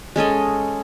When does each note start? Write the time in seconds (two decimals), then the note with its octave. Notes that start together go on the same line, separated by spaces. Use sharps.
0.16 G#3 C#4 A4 D#5